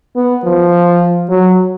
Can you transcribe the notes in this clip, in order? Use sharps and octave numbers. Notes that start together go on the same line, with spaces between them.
B3
F3
F#3